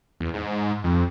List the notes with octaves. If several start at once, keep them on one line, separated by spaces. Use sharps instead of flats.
E2
G#2
F2